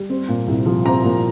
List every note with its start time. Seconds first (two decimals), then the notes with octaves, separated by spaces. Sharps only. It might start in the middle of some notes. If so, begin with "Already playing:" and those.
Already playing: G3
0.10 C4
0.28 A#2
0.48 C2
0.66 F3
0.85 C4 A#5
1.04 A#2